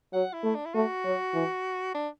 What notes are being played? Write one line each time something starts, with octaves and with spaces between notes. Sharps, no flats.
F#3 F#5
E4
A3
D4
E4
A3 F#4
F#3
E3
D4